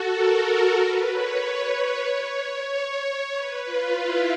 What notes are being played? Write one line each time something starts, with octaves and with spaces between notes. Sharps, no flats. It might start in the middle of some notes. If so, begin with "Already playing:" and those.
Already playing: F#4 A4
A#4
B4
C#5
C#5
B4
F4
E4